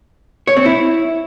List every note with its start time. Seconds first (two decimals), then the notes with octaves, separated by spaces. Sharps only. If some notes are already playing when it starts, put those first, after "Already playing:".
0.47 C#5
0.57 C4
0.66 E4